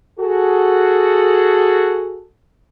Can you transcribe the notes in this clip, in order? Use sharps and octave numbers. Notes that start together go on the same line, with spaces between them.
F#4 G#4 A4